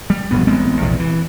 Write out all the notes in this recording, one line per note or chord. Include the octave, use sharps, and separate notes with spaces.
G3
E1 A#1 G2 B3
A1 G#3 B3 C4
A#1 E2 C3
E3